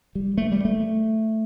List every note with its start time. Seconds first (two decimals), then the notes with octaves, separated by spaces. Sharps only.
0.15 G3
0.38 A3
0.52 G3
0.65 A3